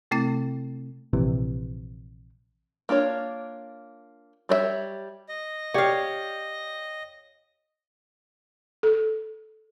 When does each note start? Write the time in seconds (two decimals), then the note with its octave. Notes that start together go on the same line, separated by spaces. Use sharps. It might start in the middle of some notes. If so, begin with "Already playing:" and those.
0.11 C3 A3 C4 E4 A6
1.13 A#1 C3 E3
2.89 A#3 D4 F4 C#5
4.49 G3 C#5 D5 E5
5.29 D#5
5.74 G4 C#5 D5 F5
8.83 A4